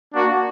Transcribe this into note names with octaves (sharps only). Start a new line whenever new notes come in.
A#3 D4 F#4